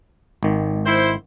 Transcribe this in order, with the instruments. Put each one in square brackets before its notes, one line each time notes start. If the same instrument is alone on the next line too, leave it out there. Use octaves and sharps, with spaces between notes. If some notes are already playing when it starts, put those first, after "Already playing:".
[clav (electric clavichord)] G#1 D#3
[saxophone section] E4 C5